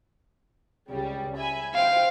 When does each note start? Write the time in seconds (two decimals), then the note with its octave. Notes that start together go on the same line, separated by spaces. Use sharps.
0.89 C#2 C#3 G3
1.38 E5 G#5 B5
1.74 C5 F5 G5